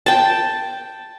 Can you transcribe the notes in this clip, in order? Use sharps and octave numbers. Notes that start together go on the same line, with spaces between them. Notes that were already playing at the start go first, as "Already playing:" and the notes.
G5 A5